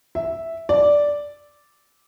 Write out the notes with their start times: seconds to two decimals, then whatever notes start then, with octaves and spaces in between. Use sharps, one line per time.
0.15 E5
0.69 D5